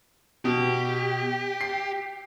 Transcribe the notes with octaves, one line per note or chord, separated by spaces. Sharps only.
B2 G4
C7